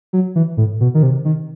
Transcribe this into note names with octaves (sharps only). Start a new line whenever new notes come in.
F#3
E3
A2
B2
D#3
C3
D#3